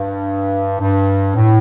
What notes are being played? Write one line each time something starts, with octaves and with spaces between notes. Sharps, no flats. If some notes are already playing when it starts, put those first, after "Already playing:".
Already playing: G2
G2
A2